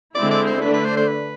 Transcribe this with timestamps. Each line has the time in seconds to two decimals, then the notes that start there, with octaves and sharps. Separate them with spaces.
0.15 D3 G#3 C4 E4 D5
0.31 D5
0.46 C5
0.61 D3 A3 D4 B4
0.74 B4
0.85 C5
0.97 C5
1.08 B4